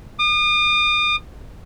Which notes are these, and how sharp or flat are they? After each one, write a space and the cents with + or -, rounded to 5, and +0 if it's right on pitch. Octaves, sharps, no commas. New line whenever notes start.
D#6 -45